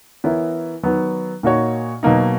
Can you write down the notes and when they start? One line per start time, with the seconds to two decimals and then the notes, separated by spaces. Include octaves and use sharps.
0.24 E3 B3 E4 A#4 C#5
0.83 D#3 F#3 B3
1.43 A#2 A#3 D#4 F#4 C#5
2.03 B2 F#3 A#3 D#4